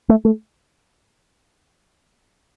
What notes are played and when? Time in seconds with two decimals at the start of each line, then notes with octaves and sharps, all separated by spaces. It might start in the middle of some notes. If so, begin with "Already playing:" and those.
0.09 A3
0.25 A3